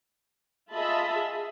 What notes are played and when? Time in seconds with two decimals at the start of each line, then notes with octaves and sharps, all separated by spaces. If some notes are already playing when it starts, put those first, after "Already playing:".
0.72 F4 G#4 D#5 E5 A5 B5
1.16 G#4